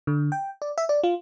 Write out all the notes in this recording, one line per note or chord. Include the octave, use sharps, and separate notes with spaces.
D3
G5
D5
E5
D5
F4